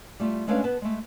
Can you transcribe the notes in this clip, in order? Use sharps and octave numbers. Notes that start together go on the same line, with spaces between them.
G3 A3 F4
G#3 A3 C#4 D4 B4 F5
B3 B4 A5
G#3 A3